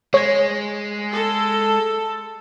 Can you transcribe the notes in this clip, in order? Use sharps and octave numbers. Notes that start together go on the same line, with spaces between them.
G#3 C#5 G#6
A4